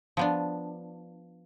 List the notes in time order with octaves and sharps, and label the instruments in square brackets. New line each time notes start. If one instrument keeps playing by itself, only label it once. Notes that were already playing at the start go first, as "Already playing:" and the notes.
[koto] F3 B3 D4